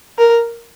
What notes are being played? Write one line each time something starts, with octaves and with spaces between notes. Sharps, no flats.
A#4